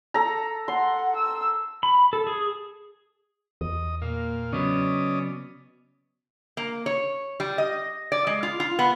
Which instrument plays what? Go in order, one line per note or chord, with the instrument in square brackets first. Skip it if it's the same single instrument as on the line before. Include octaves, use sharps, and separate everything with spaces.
[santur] A4 A#5
[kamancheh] F#5 [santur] C6
[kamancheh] E6
[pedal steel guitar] B5
A4
G#4
[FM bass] E2 [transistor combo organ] D#5
[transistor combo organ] A#2 F5 [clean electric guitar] A#3
[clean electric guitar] C#3 F#3 B3 [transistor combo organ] C#4 D5 D#5
[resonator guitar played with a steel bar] A#3
C#5
G3
D#5
D5
G#3
F4
F4
B3